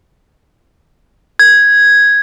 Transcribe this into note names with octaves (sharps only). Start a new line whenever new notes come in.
G#6